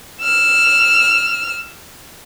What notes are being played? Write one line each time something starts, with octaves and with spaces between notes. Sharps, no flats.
E6 F6